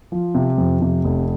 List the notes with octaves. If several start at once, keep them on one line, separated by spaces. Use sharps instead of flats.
F3
C3
F2
C3
F1